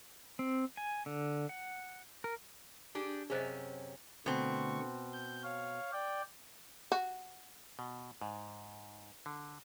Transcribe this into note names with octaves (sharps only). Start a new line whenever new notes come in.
C4
G#5
D3
F#5
A#4
D4 G4 G#4
F#2 C3 C#4 G#4 C5 D#5
B2 D3 A3 C4 C#6
G6
C#5 F5
D5 G5
F#4
B2
G#2
D3